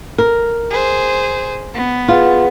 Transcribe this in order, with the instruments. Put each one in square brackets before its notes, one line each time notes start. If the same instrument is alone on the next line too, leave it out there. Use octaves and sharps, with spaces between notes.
[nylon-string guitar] A#4
[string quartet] G#4 C5
B3
[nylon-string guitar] F4 [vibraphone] G#4 B4 F#5